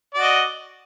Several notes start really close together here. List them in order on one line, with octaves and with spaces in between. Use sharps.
D5 F#4 D#5